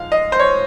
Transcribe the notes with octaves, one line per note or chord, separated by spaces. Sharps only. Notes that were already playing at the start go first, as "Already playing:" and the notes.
Already playing: G#2 F3 G#3 F5
D#5
C5
C#5